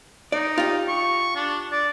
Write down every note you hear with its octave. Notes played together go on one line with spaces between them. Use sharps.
D#4 D5
F4 G4
C#6
D4
D5